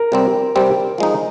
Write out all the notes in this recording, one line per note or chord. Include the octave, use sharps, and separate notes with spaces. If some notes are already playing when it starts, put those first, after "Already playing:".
Already playing: A#4
C3 G3 C4
C3 G3 C4
F3 G#3 D#4